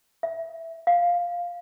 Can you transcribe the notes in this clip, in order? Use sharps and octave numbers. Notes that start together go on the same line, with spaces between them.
E5
F5